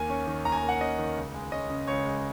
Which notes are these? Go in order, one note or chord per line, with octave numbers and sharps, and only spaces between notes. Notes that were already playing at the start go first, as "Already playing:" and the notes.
Already playing: D#2 A#3 G#5
C#4
D#3
D#2 A#5
G#5
A#5
A#3
F#5
C#4 D#5
D#3
C#2
G#3
C#4 D#5
C#3
C#2 C#5
G#3